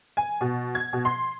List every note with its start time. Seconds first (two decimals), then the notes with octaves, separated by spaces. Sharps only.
0.17 G#5
0.41 B2
0.75 G#6
0.93 B2
1.05 C6